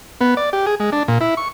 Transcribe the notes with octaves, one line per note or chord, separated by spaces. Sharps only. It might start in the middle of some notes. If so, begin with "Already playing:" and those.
B3
D5
G4
G#4
G#3
D4
A#2
E4
C#6